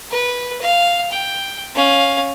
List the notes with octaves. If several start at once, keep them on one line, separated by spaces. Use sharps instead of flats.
B4
F5
G5
C#4 F5